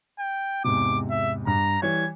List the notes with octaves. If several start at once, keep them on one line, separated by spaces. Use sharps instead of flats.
G5
E2 G#2 C3 D6
E5
G2 A#5
E3 G3 C#5 G#6